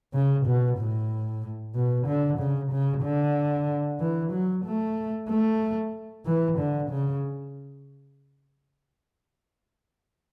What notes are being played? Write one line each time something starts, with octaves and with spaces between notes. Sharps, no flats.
C#3
B2
A2
B2
D3
C#3
C#3
D3
E3
F#3
A3
A3
E3
D3
C#3